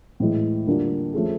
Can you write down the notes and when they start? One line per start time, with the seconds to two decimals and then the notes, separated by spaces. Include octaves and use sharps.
0.20 A2 E3 G#3
0.67 D3 G3 A#3 D4 F4
1.14 F3 A3 C#4 F4 G#4